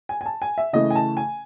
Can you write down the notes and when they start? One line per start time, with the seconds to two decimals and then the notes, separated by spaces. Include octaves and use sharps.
0.09 G#5
0.21 G#5
0.26 A5
0.42 G#5
0.58 E5
0.73 C#3 E3 A3 D#5
0.90 G#5
0.95 A5
1.17 G#5